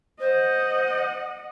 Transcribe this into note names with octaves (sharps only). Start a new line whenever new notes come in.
C5 D#5 F#5